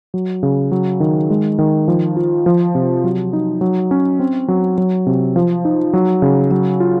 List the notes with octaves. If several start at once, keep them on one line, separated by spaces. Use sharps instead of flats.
F#3
C#3
F#3
D#3
G#3
D#3
F3
F4
F3
C3
F#3
D#4
F#3
C#4
C4
F#3
F#3
C3
F3
D#4
F#3
C#3
F#3
F4